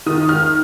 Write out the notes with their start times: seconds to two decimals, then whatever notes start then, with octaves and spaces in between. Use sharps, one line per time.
0.06 D#3 D#6
0.29 F6